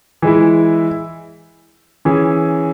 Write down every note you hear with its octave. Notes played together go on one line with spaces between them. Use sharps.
E3 G#3 E4
E3 C#4 G#4